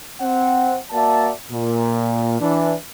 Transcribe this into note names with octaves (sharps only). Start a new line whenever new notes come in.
C4 F#5
A#3 F#4 D5 E5 A5
A#2
E3 D4